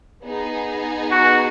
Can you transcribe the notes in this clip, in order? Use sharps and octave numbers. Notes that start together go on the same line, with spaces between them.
B3 D#4 G#4
F#4